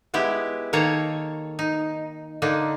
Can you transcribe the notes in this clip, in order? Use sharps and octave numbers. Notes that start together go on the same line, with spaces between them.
G#3 B3 E4 G4
D#3 A#3 A4 C#5 A#5
D#4
D3 A#3 D4 D#4